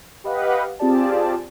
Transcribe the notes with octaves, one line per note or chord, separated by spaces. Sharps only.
G4 B4 D#5 F5 F#5
C4 F4 G4 G#4 D5 A5